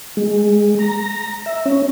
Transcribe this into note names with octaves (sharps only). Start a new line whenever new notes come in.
G#3
A#5
E5
C#4